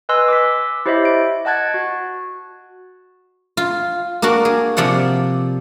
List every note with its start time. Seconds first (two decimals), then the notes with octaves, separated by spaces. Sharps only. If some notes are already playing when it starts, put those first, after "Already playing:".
0.09 B4 D#5 G#5 C6 E6 F#6
0.28 D6 E6 B6
0.86 E4 G4 C5 C#5 D#5 E5
1.05 D7
1.45 D#5 F#5 A5 F#6 G#6 A6
1.74 F#4
3.57 F4
4.22 A#3 D4 F#4 A#4
4.45 G#4
4.77 C3 F3 D5 F#5